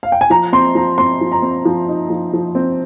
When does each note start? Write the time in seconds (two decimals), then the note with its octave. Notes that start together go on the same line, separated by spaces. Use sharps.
0.03 F5
0.12 G5
0.21 G#5
0.30 F3 A#5
0.53 C4 C6
0.75 F3 A#5
0.98 C4 C6
1.21 F3
1.32 A#5
1.42 C4
1.65 F3
1.88 D#4
2.10 F3
2.33 F3
2.55 C4